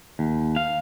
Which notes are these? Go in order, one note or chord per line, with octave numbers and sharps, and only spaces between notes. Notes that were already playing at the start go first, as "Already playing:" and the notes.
D#2
F5